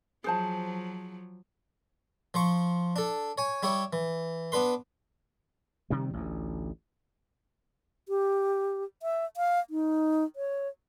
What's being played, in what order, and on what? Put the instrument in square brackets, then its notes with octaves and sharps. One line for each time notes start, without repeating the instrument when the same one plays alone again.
[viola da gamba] F3 F#3 [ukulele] G#4 C5 A5
[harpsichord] F3 C5 C#6
D4 A4
C#5 G#5
G3 E4 G4 C#5
E3
B3 D4 B4 C6
[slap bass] C3 D#3 G3
A1 D2
[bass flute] G4
E5
F5
D#4
C#5